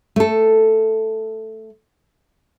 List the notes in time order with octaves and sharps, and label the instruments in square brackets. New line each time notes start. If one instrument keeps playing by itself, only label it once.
[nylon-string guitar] A3 A4